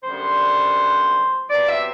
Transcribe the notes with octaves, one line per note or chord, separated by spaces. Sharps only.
F#2 D3 G3 B3 C5
C3 F#3 B3 D5
E5